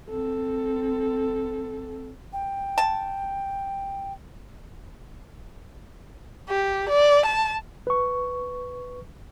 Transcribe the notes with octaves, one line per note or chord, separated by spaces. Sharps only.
C4 A4
G5
A5
G4
D5
A5
B4 C#6